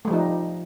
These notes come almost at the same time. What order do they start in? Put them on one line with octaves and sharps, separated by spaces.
A3 G3 F3 D#4